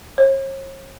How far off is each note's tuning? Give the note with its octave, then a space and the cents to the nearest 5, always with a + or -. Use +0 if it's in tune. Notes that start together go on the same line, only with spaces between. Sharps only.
C#5 -45